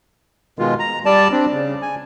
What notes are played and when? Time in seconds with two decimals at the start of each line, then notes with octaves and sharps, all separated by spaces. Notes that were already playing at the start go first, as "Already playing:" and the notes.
0.59 B2 D#3 G#3 F4
0.79 A#5
1.05 G3 D5 A5
1.32 C4 D4
1.52 C#3
1.82 G#5